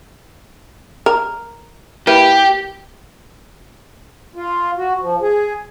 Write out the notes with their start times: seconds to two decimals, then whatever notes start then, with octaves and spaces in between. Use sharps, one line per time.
1.06 A#4
2.07 A#3 E4 G4 B4
4.36 F4
4.77 F#4
5.00 F3
5.21 G#4